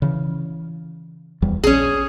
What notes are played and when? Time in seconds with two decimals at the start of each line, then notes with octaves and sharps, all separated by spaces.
0.02 C#3 E3
1.42 D1 E2 G3
1.64 A#1 C#4 G#4